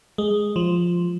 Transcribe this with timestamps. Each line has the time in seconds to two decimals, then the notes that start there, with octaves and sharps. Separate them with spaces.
0.18 G#3
0.56 F3